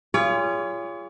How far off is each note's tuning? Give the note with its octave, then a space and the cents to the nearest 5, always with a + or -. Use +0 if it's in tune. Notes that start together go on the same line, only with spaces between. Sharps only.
F4 -25 G#4 -30 C#5 +35